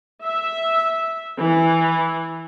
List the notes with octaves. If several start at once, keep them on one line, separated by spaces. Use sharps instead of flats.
E5
E3